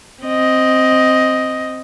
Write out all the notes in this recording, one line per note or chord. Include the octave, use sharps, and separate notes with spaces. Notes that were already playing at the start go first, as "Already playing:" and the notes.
C4 D#5